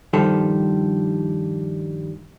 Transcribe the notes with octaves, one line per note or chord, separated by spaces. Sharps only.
G2 D#3 F3 G3 A4